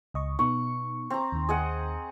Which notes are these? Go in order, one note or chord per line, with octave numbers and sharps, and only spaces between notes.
C#2 D#5 C#6
B2 B3 D#4 C#6
C4 A#5
D#2 D#3
G#4 D#5 F#5